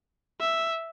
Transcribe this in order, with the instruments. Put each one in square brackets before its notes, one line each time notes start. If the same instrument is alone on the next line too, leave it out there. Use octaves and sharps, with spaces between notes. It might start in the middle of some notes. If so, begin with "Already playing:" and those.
[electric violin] E5